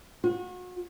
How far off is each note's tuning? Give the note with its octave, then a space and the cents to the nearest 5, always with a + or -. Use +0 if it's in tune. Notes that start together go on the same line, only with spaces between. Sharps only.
F#4 -35